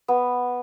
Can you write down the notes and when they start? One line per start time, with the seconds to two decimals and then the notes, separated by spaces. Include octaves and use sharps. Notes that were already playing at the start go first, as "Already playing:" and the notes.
0.08 B3